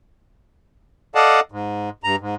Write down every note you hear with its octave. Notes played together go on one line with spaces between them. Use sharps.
A4 D5 D#5 F5 F#5 A5
G#2
G2 A#5
G#2